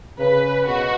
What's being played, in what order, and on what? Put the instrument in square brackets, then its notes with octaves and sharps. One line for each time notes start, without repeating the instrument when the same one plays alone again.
[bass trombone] C#3 [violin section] B4
[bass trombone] B2 [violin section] F#4